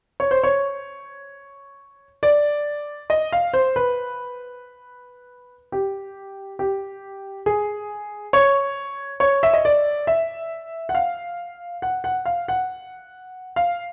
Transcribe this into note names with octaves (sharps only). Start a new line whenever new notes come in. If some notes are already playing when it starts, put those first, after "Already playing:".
C#5
C5
C#5
D5
D#5
F5
C5
B4
G4
G4
G#4
C#5
C#5
E5
D#5
D5
E5
F#5
F5
F#5
F#5
F5
F#5
F5